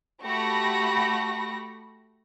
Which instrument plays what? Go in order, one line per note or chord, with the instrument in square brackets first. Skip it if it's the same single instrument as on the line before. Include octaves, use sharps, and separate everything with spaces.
[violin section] A3 F#4 G4 B5 C#6 A#6